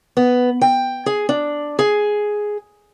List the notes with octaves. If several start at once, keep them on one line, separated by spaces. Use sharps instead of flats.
B3
G5
G#4
D4
G#4